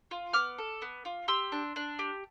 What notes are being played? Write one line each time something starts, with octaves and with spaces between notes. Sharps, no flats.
F4
B3 D6 F6
A4
B3
F4
G4 C6 E6
D4
D4
G4